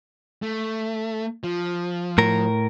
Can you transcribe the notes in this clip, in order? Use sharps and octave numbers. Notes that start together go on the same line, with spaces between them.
A3
F3
A2 A#4